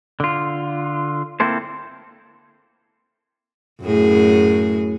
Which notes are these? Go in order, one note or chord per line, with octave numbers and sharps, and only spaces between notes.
D3 F4
A#3 C4 E4 A4 C5
F#2 A2 G#4